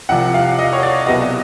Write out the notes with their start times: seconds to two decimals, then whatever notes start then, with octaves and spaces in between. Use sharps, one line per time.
0.09 C2 C3 F3 F#5
0.34 F5
0.59 D#5
0.73 C#5
0.83 D5
1.06 C2 B2 F#3 B3 D#5